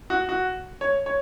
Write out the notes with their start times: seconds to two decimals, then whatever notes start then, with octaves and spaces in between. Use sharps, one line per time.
0.10 F#4
0.29 F#4
0.81 C#5
1.06 C#5